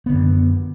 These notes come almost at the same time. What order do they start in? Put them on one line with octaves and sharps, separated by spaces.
B3 D3 F#2